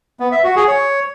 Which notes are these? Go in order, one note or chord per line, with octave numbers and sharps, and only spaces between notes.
B3
E5
F#4
G#4
C#5